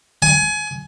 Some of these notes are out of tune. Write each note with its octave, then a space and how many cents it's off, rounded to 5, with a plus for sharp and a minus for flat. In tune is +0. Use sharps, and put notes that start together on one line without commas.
G#5 +25